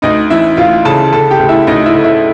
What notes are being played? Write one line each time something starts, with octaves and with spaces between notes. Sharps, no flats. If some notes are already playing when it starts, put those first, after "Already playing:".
D2 D#4 D#5
E3 E4 E5
D2 F4 F5
C#3 A4 A5
D3 A4 A5
G4 G5
D2
E4 E5
D2 D#4 D#5
E4 E5
D3
E4 E5